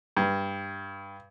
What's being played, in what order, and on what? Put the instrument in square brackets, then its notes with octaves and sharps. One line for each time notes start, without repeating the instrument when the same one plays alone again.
[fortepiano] G2